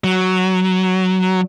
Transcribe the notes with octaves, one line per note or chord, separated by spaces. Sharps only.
F#3